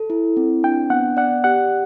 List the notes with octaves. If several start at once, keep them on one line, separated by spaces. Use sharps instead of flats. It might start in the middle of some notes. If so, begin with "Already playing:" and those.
Already playing: A4
E4
C4
D4 G5
B3 F#5
D5 F#5
G4 F#5